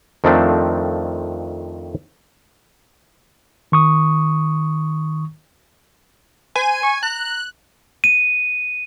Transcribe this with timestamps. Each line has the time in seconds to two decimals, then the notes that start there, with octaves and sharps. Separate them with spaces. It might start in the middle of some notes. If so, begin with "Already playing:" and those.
0.24 F2 D#3 F3 A3 C4 D4
3.72 D#3 C#6 D#6
6.56 C5 G#5
6.83 C#6
7.03 A#5 F#6
8.04 D#7